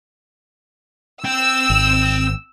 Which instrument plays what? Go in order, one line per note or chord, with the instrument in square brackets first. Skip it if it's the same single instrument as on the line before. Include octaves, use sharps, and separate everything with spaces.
[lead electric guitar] C4 G5 [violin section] E6
[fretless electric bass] G#1